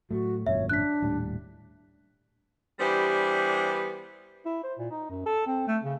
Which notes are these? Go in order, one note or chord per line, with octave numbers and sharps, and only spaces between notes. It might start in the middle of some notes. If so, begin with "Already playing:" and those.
A2 F#3 A3 F#4
G#1 F#2 A#2 C#5 E5
D4 F#6 B6
D#1 A2 G3
E3 G3 B3 D4 G4 C5
E4
C5
A#2
D#4
F#2
A4
C4
A3
C#3